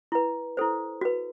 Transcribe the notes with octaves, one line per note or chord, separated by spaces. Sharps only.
E4 B4
E4 A4 C5
F#4 B4